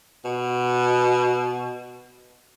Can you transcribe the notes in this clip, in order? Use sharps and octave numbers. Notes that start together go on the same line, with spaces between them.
B2